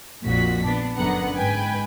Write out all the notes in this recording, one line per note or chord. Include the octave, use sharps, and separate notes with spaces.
A#1 F2 A#2 F#4 B6
B3 D4
G1 F#2 D3 B3 F#5 A#5
G#2 B4 G5 G#5